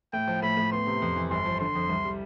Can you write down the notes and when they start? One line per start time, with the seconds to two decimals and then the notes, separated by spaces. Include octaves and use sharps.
0.13 A2 G5
0.27 F3
0.42 A2 B5
0.57 A2
0.72 B3 C6
0.87 C3
1.02 F2
1.16 E3
1.31 G1 C6
1.45 F3
1.60 D3 C6
1.75 F2
1.89 C2
2.05 G3